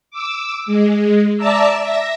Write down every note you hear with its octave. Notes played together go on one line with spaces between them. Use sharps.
D6 E6
G#3
D5 E5 A5 A#5 D6 E6
E5 A#6